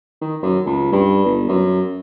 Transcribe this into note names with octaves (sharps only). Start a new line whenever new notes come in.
D#3
F#2
C#2
G2
G1
F#2